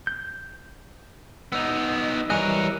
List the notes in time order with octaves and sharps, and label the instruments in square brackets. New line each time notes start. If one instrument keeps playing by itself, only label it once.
[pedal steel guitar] G6
[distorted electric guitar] B3 D#4 [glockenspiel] E6
[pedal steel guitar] E3 G3 D#5 [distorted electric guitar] A#4 C#5 [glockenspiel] G#5 F#6 D#7